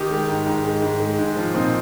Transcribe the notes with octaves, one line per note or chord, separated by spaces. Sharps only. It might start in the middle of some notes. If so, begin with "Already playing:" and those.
Already playing: D#3 D#4 G4
G#3
G#2
G#2
G#3
G#2
G#3
G#2
F3
A#2 C4 D#4